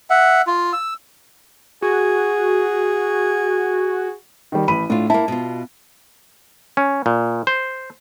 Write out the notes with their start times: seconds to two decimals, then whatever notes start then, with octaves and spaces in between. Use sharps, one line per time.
0.10 E5 F#5
0.47 F4
0.73 E6
1.82 F#4 G#4
4.52 D#3 G3
4.68 A1 B5 D#7
4.90 A2 D4 F4
5.10 A#3 E4 A5
5.28 B2 F4
6.77 C#4
7.06 A#2
7.47 C5